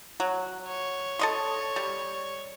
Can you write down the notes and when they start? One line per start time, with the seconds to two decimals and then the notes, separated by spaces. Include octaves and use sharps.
0.20 F#3
0.67 C#5
1.19 A4 D#5 C6
1.76 G3